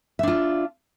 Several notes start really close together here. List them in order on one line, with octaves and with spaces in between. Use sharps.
E5 D4 F4